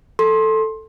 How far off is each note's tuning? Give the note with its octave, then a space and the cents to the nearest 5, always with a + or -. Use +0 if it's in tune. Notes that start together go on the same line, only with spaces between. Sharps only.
A4 +0 C6 +20